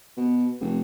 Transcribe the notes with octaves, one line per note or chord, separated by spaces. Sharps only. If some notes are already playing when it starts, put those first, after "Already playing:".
B2
F1